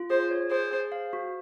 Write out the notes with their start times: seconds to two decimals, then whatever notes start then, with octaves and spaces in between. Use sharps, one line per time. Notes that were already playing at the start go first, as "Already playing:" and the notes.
Already playing: F4
0.10 G#4 C5
0.31 C#5
0.51 G#4 C5
0.71 G#4
0.92 F5
1.13 F#4